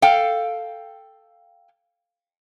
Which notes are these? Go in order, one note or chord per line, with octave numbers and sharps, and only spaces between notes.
A4 F5 G5